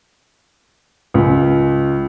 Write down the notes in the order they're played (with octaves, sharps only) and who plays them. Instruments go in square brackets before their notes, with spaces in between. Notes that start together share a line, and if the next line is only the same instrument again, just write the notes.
[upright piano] C#2